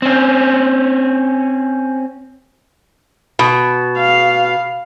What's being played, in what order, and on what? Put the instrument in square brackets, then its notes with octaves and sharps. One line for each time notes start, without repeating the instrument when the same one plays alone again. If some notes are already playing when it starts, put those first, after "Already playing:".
[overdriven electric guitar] C4 C#4
[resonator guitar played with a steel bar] B2
[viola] F5